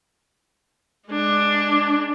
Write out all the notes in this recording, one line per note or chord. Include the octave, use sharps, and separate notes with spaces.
G#3 D4